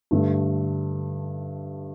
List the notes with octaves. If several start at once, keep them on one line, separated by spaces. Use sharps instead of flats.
G2 D3 A3